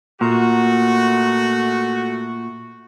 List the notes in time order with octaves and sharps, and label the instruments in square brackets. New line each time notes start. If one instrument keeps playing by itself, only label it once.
[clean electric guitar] A#2 [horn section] A3 F#4